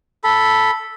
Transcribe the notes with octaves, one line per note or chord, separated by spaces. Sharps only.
A4 B5